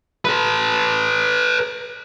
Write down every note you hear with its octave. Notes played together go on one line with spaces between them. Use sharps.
A4 B4